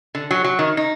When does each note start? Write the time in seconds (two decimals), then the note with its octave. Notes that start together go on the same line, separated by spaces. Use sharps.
0.15 D3
0.31 F#3
0.44 F#3
0.59 D#3
0.77 D#4